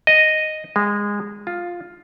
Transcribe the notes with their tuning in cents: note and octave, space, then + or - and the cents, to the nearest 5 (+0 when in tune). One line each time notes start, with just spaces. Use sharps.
D#5 -5
G#3 -20
F4 +5